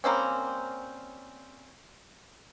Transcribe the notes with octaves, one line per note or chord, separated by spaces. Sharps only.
G3 A#3 C4 C#4